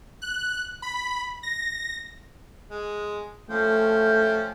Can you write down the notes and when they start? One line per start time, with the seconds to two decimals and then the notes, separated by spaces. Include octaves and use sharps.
0.22 F#6
0.82 B5
1.43 A#6
2.71 G#3
3.50 F3 A3 C#4 G5